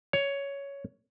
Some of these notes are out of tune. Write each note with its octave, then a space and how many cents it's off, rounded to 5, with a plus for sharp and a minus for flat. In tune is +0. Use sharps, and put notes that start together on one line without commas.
C#5 +10